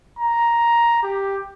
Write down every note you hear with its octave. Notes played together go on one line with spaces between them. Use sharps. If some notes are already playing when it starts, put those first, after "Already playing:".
A#5
G4